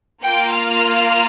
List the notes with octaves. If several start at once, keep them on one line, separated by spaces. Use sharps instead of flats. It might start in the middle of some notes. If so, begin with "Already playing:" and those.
A#3 F4 G5
F6